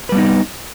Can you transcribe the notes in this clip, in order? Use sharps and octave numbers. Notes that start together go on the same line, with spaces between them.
G3 B3 D#4 B4